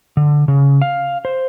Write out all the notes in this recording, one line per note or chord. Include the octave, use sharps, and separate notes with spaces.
D3
C#3
F5
C5